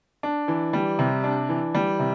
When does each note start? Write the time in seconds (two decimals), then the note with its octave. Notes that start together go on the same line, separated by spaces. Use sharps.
0.23 D4
0.48 E3
0.73 G3
0.99 C3
1.24 D4
1.49 E3
1.75 G3
1.99 C3